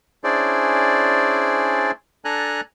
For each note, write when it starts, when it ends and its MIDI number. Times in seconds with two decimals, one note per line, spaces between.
0.24 1.91 61
0.24 1.91 62
0.24 1.91 64
0.24 1.91 68
0.24 1.91 72
0.24 1.91 74
2.25 2.61 62
2.25 2.61 69
2.25 2.61 80
2.25 2.61 82
2.25 2.61 90